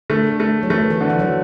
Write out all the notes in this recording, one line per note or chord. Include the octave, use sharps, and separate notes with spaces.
D3 A3
A3
F#3
E3 A3
E3
D3
E3
F#3